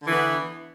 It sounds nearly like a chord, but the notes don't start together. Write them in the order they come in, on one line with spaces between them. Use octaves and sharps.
D3 E3 B3